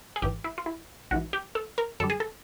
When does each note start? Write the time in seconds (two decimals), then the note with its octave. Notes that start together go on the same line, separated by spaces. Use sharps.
0.16 G#4
0.22 G#1 G#2 E3 G4
0.44 E4
0.58 F4
0.66 E4
1.11 A#1 G#2 E3 F#4
1.33 G4
1.55 A4
1.78 A#4
2.00 F#2 D3 G3 A4
2.10 G#4
2.20 A4